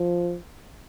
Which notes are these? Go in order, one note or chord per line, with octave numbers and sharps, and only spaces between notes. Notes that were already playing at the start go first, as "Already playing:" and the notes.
Already playing: F3